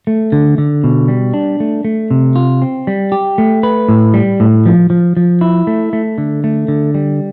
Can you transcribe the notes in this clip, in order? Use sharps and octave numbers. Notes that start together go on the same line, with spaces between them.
A3
D3
D3
B2
G3
D4
A3
A3
C3
F4
C4
G3
G4
A3
B4
A2
G3
A2
F3
F3
F3
E4
A3
A3
D3
A3
D3
G3